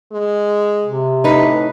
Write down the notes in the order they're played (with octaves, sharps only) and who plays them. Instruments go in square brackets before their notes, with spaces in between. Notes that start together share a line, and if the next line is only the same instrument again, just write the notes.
[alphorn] G#3
[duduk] C3
[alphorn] A2 [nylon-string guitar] D#4 B4